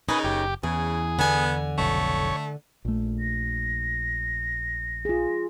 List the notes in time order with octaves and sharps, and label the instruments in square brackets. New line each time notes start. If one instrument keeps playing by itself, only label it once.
[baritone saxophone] C#3 [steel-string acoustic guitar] D#4 A#4 C#5 [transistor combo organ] G#4 B4 D#5
[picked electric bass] F#1 [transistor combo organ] G4
[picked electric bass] E2 [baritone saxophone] C#3 [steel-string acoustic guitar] E3 [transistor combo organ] G#4
[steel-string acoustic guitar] D3 G#5 [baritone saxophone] B3
[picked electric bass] F1 B1 F2 [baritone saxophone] A3 [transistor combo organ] C#5
[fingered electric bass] A#1 A3
[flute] A#6
[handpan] F4 G#4